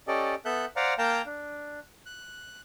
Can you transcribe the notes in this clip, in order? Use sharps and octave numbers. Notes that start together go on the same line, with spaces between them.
C#4 G4 A4 D5 D#5
B3 A4 E5 F#6 G6
C5 D5 F5 F#5 A#5
A#3 F5 G5 A5 A#5 G6
D4
F#6